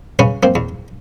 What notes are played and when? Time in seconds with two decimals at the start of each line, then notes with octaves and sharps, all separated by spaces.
0.19 C#3 B3 C#4
0.43 A#3 C4
0.55 E2